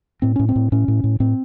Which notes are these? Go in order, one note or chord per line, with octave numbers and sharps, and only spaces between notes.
A2 C4
A2 C#4
C4
A2
A2 C#4
A2
A2
A2 C4